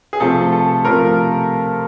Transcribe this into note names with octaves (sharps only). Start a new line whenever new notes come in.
G#4
C3 F3 A3 A4
A4
C3 F3 A3 A#4